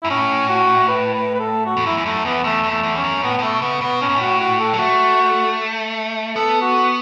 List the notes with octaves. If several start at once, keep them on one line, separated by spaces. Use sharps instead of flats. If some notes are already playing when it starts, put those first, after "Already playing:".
F#2 E4
A2 C#4
F#4
B4
B4
B4
A4
F#4
E2
F#2 E4
E2
F#2 A3
E2 B3
E2 A3
E2
A3
E2
C#4
F#2
A2 B3
A2
B2 A3
C#3 B3
B2 B3
A2 C#4
F#2
A2 F#4
F#4
A4
F#3
A3 F#4
B3 A4
F#4